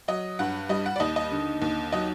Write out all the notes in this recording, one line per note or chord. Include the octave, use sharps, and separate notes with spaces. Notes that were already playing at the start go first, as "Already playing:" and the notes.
F#3 D#5
G2 F#5
G3 D#5
F#5
D5
D#2 D#5
D#5
D3
D#2
F#3 D#5